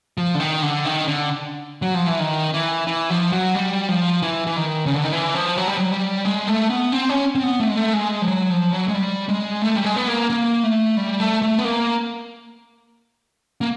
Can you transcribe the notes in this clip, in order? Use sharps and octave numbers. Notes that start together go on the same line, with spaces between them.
F3
D3
D#3
D3
D#3
D3
F#3
F3
E3
D#3
E3
E3
F3
F#3
G3
F3
E3
E3
D#3
C#3
D3
D#3
E3
F3
F#3
G3
F#3
G3
G#3
A3
B3
C4
C#4
C4
B3
A3
G#3
A3
G#3
F3
F#3
F3
F#3
G#3
G3
G#3
A3
G3
G#3
B3
A#3
A#3
A3
G3
A3
A3
B3
A#3
A#3